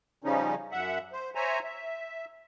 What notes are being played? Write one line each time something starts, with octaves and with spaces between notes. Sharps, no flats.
C#3 F3 G3 C#4 D#4
F#2 E5 F#5
C5
C5 C#5 E5 G#5 A#5
E5